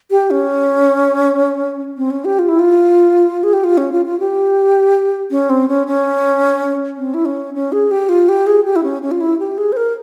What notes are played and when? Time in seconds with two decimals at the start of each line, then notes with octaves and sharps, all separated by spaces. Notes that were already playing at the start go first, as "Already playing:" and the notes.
0.11 G4
0.31 C#4
1.97 C4
2.10 C#4
2.25 G4
2.39 F4
2.49 E4
2.59 F4
3.44 G#4
3.53 G4
3.64 F4
3.77 C#4
3.92 F4
4.06 F4
4.20 G4
5.31 C#4
5.50 C4
5.68 C#4
5.87 C#4
6.98 C4
7.14 E4
7.25 C#4
7.54 C#4
7.72 G#4
7.91 G4
8.09 F4
8.29 G4
8.47 G#4
8.65 G4
8.76 E4
8.83 C#4
9.02 C#4
9.11 F4
9.21 E4
9.39 G4
9.58 G#4
9.72 C5
9.77 A#4